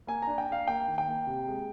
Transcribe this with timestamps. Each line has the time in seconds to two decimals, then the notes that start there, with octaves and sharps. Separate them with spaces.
0.07 A#3 G#5
0.22 D4 A#5
0.38 G5
0.48 D4 F5
0.68 A#3 G5
0.88 D#3
0.98 G5
1.08 A#3
1.27 C3
1.47 G#3